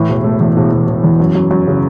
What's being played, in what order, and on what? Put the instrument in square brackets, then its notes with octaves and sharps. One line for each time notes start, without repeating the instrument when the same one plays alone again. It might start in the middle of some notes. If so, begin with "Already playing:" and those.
Already playing: [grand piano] A2 E3
E1
A3
E2
E1
E1
E1
E2
F#2
F#2
F#2
C#3